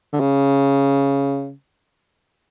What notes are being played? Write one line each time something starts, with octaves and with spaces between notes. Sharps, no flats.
D3
C#3